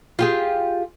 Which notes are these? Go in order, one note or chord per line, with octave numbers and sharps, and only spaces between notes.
F4 G4 G#4